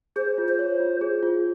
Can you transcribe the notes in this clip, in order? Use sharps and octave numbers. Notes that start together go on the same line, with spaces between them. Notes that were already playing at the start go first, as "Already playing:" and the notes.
G#4 C5
F4
C5
C#5
F4
G#4
F4